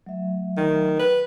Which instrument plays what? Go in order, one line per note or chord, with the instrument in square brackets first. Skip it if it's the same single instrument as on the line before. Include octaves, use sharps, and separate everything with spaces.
[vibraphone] F#3 A3 E5
[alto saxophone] D#3
B4